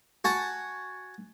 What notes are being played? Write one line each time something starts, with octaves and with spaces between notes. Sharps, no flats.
F#4 G#5 A5